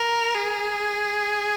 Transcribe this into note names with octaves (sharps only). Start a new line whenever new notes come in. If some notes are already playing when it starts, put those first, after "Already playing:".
Already playing: A#4
G#4